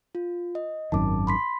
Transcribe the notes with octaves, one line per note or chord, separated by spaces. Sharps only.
F4
D#5
G#1 F#2 D#3 A5 D6
B5 C6 B6